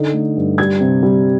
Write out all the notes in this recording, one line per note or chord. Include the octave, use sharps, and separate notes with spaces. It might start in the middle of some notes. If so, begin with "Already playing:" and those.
Already playing: D3 D#4
A3
G2
G3 G#6
C3
G3